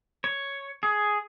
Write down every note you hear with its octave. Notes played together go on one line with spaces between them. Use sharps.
C#5
G#4